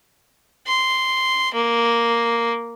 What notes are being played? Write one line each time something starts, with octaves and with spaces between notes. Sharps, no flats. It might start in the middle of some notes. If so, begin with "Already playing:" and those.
C6
A#3